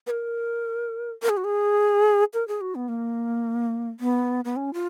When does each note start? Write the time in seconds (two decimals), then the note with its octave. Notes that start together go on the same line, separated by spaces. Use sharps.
0.07 B4
0.11 A#4
1.22 A#4
1.29 G#4
1.37 F#4
1.44 G#4
2.34 A#4
2.48 G#4
2.61 F#4
2.75 B3
2.88 A#3
4.00 B3
4.45 B3
4.56 C#4
4.74 F4